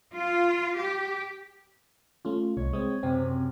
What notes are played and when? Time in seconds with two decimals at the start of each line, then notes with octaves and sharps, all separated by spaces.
0.12 F4
0.75 G4
2.25 A3 C#4 F4
2.57 C2 C#5
2.73 G#3 C4 D#6 G#6
3.03 F#2 C3 C4 D#7